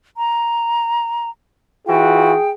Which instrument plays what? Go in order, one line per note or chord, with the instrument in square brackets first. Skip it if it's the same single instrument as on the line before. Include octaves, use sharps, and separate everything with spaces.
[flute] A#5
[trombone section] E3 F4 F#4 [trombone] G#4 [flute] G5